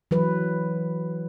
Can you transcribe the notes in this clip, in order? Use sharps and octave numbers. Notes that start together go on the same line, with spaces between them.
E3 F#3 B4